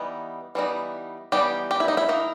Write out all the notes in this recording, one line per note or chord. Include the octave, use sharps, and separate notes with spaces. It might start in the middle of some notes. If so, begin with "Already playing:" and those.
Already playing: E3 G3 B3 D#4
E3 G3 B3 D#4
E3 G3 B3 D#4 G4
G4
E4
D#4
E4
D#3 A#3 D#4